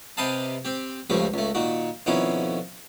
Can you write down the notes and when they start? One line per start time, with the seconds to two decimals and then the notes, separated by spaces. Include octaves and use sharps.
0.17 C3 G4 B4 D#5 F5 A5
0.65 C4 G4
1.10 C#2 G2 F3 G3 A3
1.34 C#2 A3
1.55 A#2 D#3 F#4
2.06 F2 B2 D#3 C#4 E4